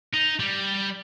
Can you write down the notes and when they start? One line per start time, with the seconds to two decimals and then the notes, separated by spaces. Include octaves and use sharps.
0.13 D#4
0.40 G3